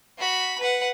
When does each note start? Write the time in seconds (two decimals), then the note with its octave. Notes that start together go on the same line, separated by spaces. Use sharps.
0.19 F#4 B5
0.60 B4 F#5